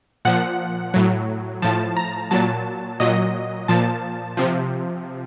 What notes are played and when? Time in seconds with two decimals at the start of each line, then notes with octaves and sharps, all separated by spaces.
0.25 A#2 F3 F#5
0.94 A2 F#3
1.62 A2 F3 A5
1.97 A#5
2.31 A#2 F#3 A5
3.00 A#2 F#3 D#5
3.68 A#2 F3 A5
4.37 C3 F3